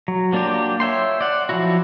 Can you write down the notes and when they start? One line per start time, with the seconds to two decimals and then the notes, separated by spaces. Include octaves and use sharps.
0.08 F#3
0.32 F#3 A#3 D4 F4 G4
0.80 C#5 E5 G5 C6
1.21 D5 F#5
1.49 F3 F#3 E4 F#4